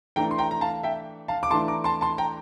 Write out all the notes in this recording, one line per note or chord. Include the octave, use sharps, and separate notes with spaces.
E3 A3 D4 G5 A#5
C6
G5 A#5
A#5
F5 A5
E5 G5
F5 A5
D6
E3 A3 D4 A5 C6
A#5 D6
A5 C6
A5 C6
G5 A#5